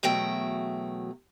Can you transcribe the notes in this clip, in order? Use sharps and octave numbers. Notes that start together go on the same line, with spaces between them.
E2 B2 F#3 A3 G5